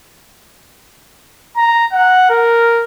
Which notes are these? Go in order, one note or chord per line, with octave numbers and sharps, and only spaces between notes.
A#5
F#5
A#4